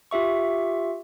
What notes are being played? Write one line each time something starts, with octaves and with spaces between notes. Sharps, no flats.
F4 G4 E5 C#6